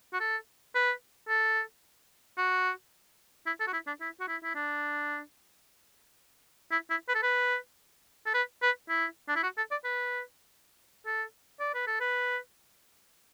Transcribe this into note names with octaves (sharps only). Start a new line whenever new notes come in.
F#4
A4
B4
A4
F#4
E4
A4
F#4
E4
D4
E4
F#4
E4
E4
D4
E4
E4
B4
A4
B4
A4
B4
B4
E4
D4
E4
F#4
A4
D5
B4
A4
D5
B4
A4
B4